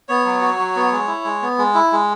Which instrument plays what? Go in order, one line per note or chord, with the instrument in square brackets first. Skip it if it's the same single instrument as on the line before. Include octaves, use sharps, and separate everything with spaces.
[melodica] B3 C#5
F#3
F#4
F#3
B3
G#3
E4
G#3
B3
G#3
E4
G#3